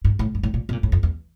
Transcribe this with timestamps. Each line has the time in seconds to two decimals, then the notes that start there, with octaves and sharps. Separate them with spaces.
0.05 G#2
0.19 A2
0.35 G2
0.43 A2
0.54 A#2
0.69 B2
0.73 A#2
0.83 A2
0.92 F2
1.03 E2